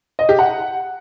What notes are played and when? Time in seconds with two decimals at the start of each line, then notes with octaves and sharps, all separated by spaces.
0.19 D#5
0.29 G4
0.39 F#5